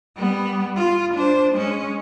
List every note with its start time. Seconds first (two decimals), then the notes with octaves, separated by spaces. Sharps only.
0.16 G3 B3
0.77 F4
1.14 D4 C5
1.53 G#3 C#4